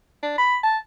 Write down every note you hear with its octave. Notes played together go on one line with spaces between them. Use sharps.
D4
B5
A5